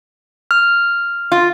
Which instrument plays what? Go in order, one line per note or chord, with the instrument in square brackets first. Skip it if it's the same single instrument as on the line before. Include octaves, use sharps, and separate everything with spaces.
[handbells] F6
[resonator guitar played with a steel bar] F4